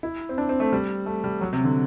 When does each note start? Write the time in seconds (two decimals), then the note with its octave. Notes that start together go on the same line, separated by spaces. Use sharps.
0.03 E4
0.29 C4
0.38 D4
0.49 C4
0.60 A3
0.72 G3
1.06 A3
1.24 G3
1.41 F#3
1.53 C3
1.64 D3